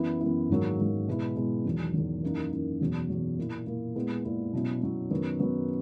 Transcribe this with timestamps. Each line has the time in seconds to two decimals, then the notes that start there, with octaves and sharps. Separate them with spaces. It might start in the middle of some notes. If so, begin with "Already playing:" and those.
Already playing: F#2 E3 B3 E4
0.20 F#2 E3 B3 E4
0.50 G#2 D#3 F#3 A#3
0.79 G#2 D#3 F#3 A#3
1.08 B2 G#3 B3 E4
1.36 B2 G#3 B3 E4
1.65 E2 D#3 F#3
1.94 E2 D#3 F#3
2.23 F#2 E3 A#3 D#4
2.52 F#2 E3 A#3 D#4
2.80 E2 B2 F#3
3.10 E2 B2 F#3
3.38 A#2 A#3 E4
3.66 A#2 A#3 E4
3.95 A#2 G#3 B3 E4
4.25 A#2 G#3 B3 E4
4.53 B2 F#3 C#4 E4
4.82 B2 F#3 C#4 E4
5.11 F#2 D#3 F#3 B3
5.40 F#2 D#3 F#3 B3